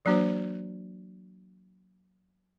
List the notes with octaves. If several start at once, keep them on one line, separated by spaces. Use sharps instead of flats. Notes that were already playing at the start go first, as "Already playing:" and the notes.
E3 F#3 A#3 D4 F#4 C5